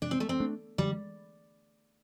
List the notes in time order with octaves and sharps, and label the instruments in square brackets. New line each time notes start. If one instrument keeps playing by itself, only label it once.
[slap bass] C3 [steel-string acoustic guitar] D4
[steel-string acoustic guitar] C4
A3
C4
[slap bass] A3 D4
[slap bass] D3 [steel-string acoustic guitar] G3